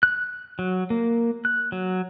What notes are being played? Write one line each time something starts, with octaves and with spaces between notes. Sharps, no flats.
F#6
F#3
A#3
F#6
F#3